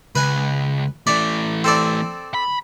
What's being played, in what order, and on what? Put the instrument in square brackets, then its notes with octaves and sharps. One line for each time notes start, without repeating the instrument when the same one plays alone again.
[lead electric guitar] C#2 [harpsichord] B4 G#5
[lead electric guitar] E3 A3 [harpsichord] D5
[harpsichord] C4 A4 D5
[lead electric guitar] B5